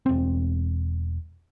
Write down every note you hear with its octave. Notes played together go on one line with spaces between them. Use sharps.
E1 C4